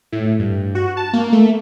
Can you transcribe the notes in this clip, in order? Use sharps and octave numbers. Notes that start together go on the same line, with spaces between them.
A2
G2
F#4
A5
A#3
A3